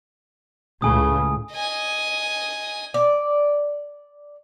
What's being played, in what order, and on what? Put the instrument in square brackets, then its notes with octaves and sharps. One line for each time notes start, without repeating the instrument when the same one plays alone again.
[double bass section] C#2 A2 C#3 [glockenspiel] G#5 D#6
[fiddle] D#5 G#5
[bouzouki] D5